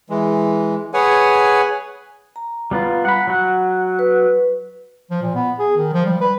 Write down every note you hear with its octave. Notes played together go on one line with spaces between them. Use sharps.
E3 G#3
G#4 B4 C#5 F#5 G#5
A#5
G3 B3 F4
F#5 B5
F#3 F#5
B4
F3
A#2
B3
G#4
D#3
F3
G3
B4